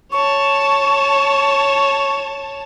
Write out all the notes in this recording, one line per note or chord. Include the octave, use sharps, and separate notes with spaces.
C#5 A5 C#6